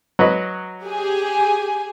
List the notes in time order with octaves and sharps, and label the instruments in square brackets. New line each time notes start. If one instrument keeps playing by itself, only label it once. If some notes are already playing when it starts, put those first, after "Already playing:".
[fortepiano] F#3 B4 D#5
[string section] G4 G#4 G#5